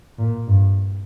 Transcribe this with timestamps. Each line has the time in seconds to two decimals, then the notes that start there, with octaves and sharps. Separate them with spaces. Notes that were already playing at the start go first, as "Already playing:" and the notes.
0.19 A#2
0.48 G2